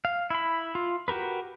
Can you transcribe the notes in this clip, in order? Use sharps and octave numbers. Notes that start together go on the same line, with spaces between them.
F5
E4 B5
F4
F#4 G4 A#4 B4